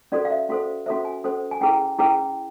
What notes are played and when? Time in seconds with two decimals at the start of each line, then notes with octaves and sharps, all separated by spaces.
0.12 C#4 F#4 A4 C5 D5
0.25 F5
0.30 E5
0.49 C#4 F#4 A4 C5
0.86 C#4 F#4 A4 C5 E5
1.05 G#5
1.24 C#4 F#4 A4 C5
1.51 G#5
1.61 C#4 E4 G#4 B4 G5
1.99 C#4 E4 G#4 B4 G5